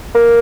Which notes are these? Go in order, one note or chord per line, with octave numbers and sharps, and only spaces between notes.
A#3